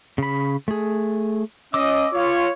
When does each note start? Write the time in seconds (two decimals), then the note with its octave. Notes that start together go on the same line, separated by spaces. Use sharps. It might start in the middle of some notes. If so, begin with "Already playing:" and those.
0.18 C#3 B5
0.68 A3 G#4
1.74 C#4 D#5 D6 E6
2.13 F4 C#5